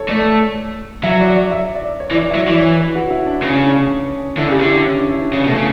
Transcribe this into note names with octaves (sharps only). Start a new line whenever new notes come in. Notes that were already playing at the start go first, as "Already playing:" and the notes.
Already playing: A4 C#5
A3 D5
F#3 E5
D5
D5
E5
D5
C#5
E3
D5
E5
F#3
E3 D5
C#5
B4
F#4
E4
D4
C#3 D4
C#4
D4
D4
D3 E4
C#3 G4
D3 E4
D4
C#4
D4
E4
D4
C#3 C#4
B2 A3
C#3